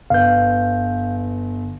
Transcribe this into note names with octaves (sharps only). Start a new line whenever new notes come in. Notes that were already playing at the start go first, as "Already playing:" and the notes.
G1 B4 F5 G6